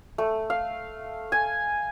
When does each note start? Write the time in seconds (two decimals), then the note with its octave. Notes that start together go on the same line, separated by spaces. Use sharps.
0.18 A3
0.50 F5
1.32 G#5